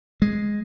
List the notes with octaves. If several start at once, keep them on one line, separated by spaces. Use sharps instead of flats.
G#3